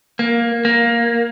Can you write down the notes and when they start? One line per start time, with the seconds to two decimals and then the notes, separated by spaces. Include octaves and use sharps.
0.19 A#3
0.65 A#3